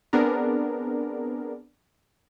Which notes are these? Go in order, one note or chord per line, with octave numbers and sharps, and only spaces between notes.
B3 C4 D4 G#4 A#4